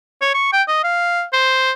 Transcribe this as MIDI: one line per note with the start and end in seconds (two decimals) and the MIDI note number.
0.22 0.32 73
0.34 0.51 85
0.53 0.63 79
0.68 0.83 75
0.84 1.23 77
1.33 1.72 72